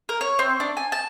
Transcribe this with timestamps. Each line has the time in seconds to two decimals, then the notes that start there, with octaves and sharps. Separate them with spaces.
0.09 A#4
0.21 C#5
0.39 C4
0.60 D4
0.77 G#5
0.92 A5